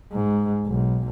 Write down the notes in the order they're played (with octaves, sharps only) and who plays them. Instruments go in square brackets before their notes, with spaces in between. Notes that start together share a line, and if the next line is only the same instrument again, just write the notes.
[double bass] G#2
B1